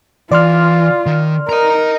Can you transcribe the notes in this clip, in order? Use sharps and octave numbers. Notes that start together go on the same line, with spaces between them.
E3 F4 D5 C6 F6
D#3
A#4 D#5 A#5